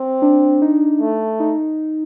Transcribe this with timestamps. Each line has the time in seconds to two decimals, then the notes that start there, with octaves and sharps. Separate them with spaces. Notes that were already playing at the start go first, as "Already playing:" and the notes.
Already playing: C4
0.22 D4
0.62 D#4
1.01 A3
1.40 D#4